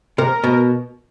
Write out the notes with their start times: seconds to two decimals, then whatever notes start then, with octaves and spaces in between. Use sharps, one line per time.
0.18 C3 A#4
0.44 B2